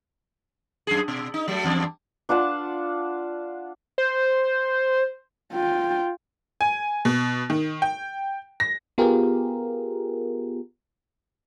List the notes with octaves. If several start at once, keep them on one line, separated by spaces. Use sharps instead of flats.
F#2 G#4
B2
D#4
F#3 G3 A3
E2 G2 D5
D4 F4 F#5 A5
C5
F4 G5
G#5
B2
D#3
G5
A#6
B3 F4 G4 G#4 A#4